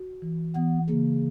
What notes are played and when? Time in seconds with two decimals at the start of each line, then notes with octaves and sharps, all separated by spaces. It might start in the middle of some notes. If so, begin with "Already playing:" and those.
Already playing: F#4
0.22 E3
0.55 E3 B3
0.89 C#3 A#3